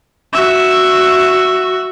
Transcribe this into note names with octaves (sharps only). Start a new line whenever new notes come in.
F#4 E5